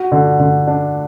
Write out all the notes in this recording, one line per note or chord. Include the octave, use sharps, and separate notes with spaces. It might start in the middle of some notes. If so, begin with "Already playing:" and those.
Already playing: F#4
D3
D3
D4